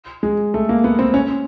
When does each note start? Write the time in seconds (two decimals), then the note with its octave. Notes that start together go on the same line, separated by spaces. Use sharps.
0.23 G#3
0.54 A3
0.69 A#3
0.84 B3
0.99 C4
1.14 C#4